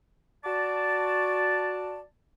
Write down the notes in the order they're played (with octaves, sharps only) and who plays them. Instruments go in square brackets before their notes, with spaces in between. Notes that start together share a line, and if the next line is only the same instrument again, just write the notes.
[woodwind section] F#4 D5 A5